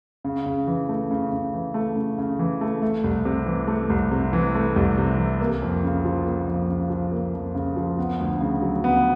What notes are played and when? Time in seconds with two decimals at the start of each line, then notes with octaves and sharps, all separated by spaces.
0.24 C#3
0.46 C#3
0.67 E3
0.89 A3
1.11 C#3
1.32 C#3
1.53 E3
1.74 A3
1.96 C#3
2.18 C#3
2.39 E3
2.61 A3
2.82 A3
3.04 C2
3.25 C3
3.46 E3
3.68 A3
3.90 C2
4.11 C3
4.33 E3
4.55 A3
4.76 C2
4.98 C3
5.18 E3
5.41 A#3
5.62 F2
5.83 C#3
6.05 F3
6.26 A#3
6.48 F2
6.69 C#3
6.90 F3
7.11 A#3
7.34 F2
7.55 C#3
7.76 F3
7.98 B3
8.20 D2
8.40 C#3
8.62 F#3
8.84 B3